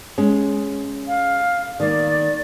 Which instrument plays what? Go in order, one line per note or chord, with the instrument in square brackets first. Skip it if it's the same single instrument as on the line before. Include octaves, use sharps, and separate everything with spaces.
[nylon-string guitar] G#3 C#4
[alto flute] F5
[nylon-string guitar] D#3 A#3 [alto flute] D5